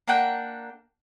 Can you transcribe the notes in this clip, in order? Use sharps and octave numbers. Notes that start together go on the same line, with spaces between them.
A#3 D4 F#5 G5